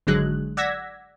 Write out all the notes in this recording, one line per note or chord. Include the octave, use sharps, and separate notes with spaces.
G#1 D3 F#3 G#3 F#6
D5 F#5 E6 G#6 A#6 B6